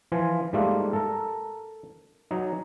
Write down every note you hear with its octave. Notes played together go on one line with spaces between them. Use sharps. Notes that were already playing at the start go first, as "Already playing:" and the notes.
E3 F3 F4 G#5
G#2 G3 A3 A#3 F4
A4 A#4
F#3 D#4